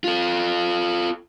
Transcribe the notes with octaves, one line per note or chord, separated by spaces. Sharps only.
F4 A4